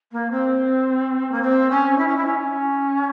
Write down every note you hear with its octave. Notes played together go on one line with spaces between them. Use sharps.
A#3
C4
A#3
C4
C#4
E4
C#4
E4
C#4